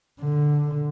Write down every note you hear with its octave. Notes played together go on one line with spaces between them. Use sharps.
D3